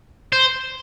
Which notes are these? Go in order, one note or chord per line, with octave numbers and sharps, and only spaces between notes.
C5